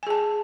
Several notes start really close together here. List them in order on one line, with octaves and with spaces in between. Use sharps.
G#5 G#4 A5